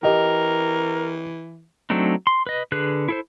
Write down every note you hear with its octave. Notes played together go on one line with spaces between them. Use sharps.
E3 G4 A#4 D#5
F#3 A3 C4 D4 D#4
C6
B4 D#5
D3 G#4 B4 F#6
E4 A4 C5